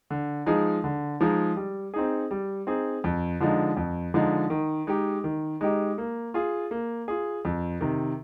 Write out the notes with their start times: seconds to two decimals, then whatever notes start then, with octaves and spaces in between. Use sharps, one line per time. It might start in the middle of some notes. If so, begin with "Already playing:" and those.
0.10 D3
0.46 F3 G#3 D#4 G#4
0.84 D3
1.21 F3 G#3 D#4 G#4
1.56 G3
1.94 C4 D#4 G#4
2.31 G3
2.67 C4 D#4 G#4
3.04 F2
3.40 D3 F3 G#3 D#4
3.77 F2
4.14 D3 F3 G#3 D#4
4.50 D#3
4.87 G#3 D#4 G4
5.24 D#3
5.61 G#3 D#4 G4
5.98 A#3
6.34 F4 G#4
6.71 A#3
7.08 F4 G#4
7.45 F2
7.81 C3 D#3